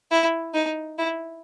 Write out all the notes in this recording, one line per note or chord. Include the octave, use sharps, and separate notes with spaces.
E4
D#4
E4